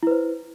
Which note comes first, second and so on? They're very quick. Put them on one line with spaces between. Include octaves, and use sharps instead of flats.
E4 B4 C5